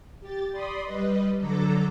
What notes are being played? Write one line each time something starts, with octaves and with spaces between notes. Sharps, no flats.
G4 A6
D5 B5 C6 D#6
G3 B4 D#5
D3 F#3 A4 A#5 D6